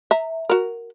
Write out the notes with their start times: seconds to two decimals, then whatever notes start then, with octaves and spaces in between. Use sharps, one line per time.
0.11 E5 A#5
0.49 F#4 A#4